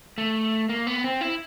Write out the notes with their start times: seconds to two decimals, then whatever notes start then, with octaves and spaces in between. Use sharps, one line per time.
0.18 A3
0.69 A#3
0.87 B3
1.04 C4
1.21 E4